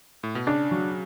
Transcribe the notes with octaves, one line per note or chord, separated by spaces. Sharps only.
A2
B2
C#3 D4
F#3